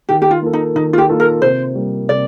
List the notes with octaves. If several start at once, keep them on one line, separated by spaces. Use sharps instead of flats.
D#3 G4
G4
F4
A#3 F4 A4
D#4
D#3 D#4
F4
G4
A#3 F4 A4
A#4
C3 C5
G3 A#3
C3 D5